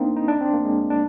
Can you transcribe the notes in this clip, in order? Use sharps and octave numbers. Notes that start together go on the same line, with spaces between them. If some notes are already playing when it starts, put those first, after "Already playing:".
Already playing: A#3 C4 D4 D#4
D#4
D4
C4
A#3
G#3
D4